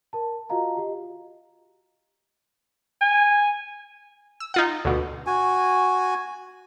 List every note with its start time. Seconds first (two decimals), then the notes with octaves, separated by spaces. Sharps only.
0.13 A#4 A5
0.50 F4 F#4 D#5 F5 A#5
0.77 G4 D#5
3.01 G#5
4.40 E6
4.54 D#4 F4 F#5
4.85 D2 B2
5.27 F#4 G#5